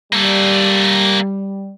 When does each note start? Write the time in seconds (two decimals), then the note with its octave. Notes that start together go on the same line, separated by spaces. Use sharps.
0.13 G3 A#3 A4